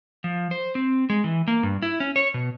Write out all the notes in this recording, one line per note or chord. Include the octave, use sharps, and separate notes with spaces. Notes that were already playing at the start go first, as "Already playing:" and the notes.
F3
C5
C4
G#3
E3
A#3
G2
E4
C#4
C#5
B2